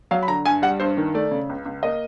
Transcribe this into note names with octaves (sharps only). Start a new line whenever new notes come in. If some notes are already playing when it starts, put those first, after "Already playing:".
F#3 F5
B5
D3 A#5
G2 G#5
G3 F#5
G2 C5
D#3
A3 D5
C#3
C#2
C#2
A#3 D#5